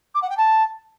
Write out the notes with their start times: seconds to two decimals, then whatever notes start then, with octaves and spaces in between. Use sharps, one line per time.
0.14 D6
0.22 F#5
0.29 G5
0.37 A5